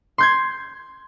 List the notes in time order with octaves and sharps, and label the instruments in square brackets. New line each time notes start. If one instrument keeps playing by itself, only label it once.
[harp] C6 G6 G#6